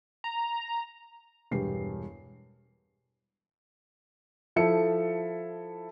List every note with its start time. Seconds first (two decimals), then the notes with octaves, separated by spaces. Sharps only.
0.24 A#5
1.51 E1 G2 G4 C7
4.56 F3 E4 A4 C#7